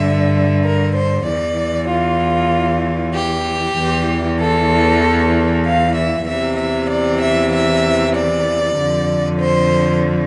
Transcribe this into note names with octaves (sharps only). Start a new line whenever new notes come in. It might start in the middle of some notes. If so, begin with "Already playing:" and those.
Already playing: G2 D3 E5
A#4
C5
E2 E3 D5
F4
G4
E2 E3
A4
F5
E5
E2 C3 E3 E5
E5
D5
E5
E5
D5
F2 D3
C5